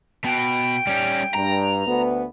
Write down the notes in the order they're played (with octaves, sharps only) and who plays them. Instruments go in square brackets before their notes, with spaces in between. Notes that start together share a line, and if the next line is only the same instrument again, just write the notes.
[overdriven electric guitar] B2 [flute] G5
[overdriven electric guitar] G3 C#4
[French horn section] G2 [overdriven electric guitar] A#5
[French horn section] D2 B3